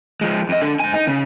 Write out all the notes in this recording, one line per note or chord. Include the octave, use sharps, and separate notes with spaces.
F3 G#3
F2 D#5
D4 A4
G#2 G#5
D#4
C#3